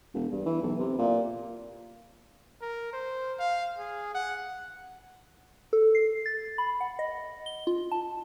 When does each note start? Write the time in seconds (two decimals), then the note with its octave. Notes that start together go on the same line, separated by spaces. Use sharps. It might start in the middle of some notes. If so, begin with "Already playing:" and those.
0.14 E1
0.31 G2
0.46 E3
0.62 B1
0.79 C3
0.98 A#2
2.61 A#4
2.93 C5
3.39 F5
3.78 G#4
4.15 F#5
5.73 A4
5.95 C7
6.26 A6
6.58 B5
6.81 F#5
6.99 D#5
7.46 G7
7.67 F4
7.91 A5